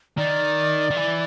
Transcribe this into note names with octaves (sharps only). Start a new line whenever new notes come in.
D#3 D5
D#3
E3